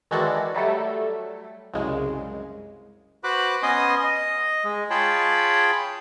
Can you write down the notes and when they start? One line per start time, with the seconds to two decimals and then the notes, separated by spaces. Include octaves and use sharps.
0.11 D#3 E3 G#3 F#4 A4 D5
0.54 F#3 G3 A3 A4
1.74 C2 F#2 C#3 G#3
3.24 F#4 B4 C5 B5 D6 F#6
3.63 B3 C#4 D#5 G#5 C6 D#6
4.04 D#5
4.65 G#3
4.90 F4 G#4 C#5 G5 A5 B5